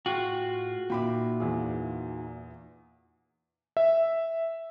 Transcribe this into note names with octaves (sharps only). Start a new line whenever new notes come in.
A2 F4 F#4 G#4 G5
A#2 A#3 D#4 E5 G5 B5 D6
E2 G#4
E5